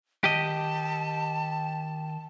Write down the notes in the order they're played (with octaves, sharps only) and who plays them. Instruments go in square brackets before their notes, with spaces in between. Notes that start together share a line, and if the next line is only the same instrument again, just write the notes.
[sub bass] D#3 [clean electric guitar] G4 D#5 [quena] A5